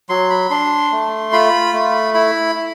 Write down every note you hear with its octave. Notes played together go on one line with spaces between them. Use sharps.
F#3 C6
B5
D4 C6
A3
F4 B5
A3
E4 B5
E4